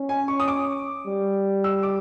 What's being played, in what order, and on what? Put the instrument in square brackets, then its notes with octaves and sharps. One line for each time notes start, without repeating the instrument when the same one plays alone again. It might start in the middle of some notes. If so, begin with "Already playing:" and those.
Already playing: [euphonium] C#4
[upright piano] G#5
C#6
D#6
D6
[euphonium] G3
[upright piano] E6
D6